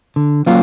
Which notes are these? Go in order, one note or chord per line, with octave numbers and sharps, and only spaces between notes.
D3
F#3 A#3 C#4 F4